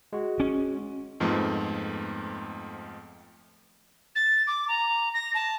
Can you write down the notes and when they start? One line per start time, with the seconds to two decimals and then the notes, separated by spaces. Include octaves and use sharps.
0.13 G#3 F#4
0.40 C#4
1.20 F2 G#2 F3 A3 B3 C4
4.15 A6
4.47 D6
4.68 A#5
5.13 A#6
5.34 A5